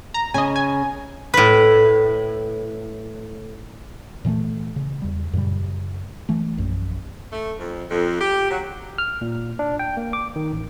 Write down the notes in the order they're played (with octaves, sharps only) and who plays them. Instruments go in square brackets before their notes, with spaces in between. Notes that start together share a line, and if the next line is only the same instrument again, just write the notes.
[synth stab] A#5
[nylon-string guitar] C#3 [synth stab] D#5 G#5
[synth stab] G#5
[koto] A2 B4
[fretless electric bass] A#2 E3 F#3 A3
C#3
E2 G3
F#2 A#2 C#3 G3
E3 A3
A#1 F#2
[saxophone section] A3
F2
F2
G4
F#3
[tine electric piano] F6
A#2
D4
G5
A#3
D6
D#3
A1